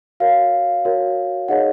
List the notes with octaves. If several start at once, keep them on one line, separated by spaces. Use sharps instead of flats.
F#4 A#4 C#5 F5
F#4 A#4 C#5
D#4 G#4 C#5 D#5 F#5